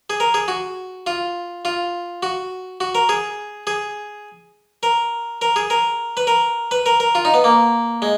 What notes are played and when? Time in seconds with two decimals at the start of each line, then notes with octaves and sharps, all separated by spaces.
0.10 G#4
0.20 A#4
0.34 G#4
0.48 F#4
1.07 F4
1.65 F4
2.23 F#4
2.80 F#4
2.95 A#4
3.09 G#4
3.67 G#4
4.83 A#4
5.42 A#4
5.56 G#4
5.70 A#4
6.17 B4
6.27 A#4
6.71 B4
6.86 A#4
7.00 A#4
7.15 F4
7.25 D#4
7.34 B3
7.44 A#3
8.02 G#3